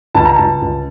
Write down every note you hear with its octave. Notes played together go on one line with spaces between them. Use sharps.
C#2 A5
A#5
C#2 A5
C#2